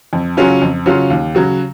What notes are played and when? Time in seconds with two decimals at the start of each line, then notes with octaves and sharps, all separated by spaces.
0.13 F2
0.37 C#3 F#3 C#4 F4
0.62 F2
0.86 C#3 F#3 C#4 F4
1.10 D#2
1.35 C#3 F#3